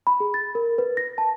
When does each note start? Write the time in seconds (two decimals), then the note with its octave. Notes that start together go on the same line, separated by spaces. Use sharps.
0.07 B5
0.20 G#4
0.34 A6
0.55 A#4
0.78 B4
0.97 A#6
1.18 A5